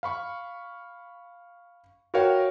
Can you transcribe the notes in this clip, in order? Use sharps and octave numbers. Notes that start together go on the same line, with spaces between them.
F5 B5 C#6
F#4 A#4 B4 C#5 F5 G5